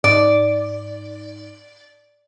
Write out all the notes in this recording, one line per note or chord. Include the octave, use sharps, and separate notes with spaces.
G#2 D5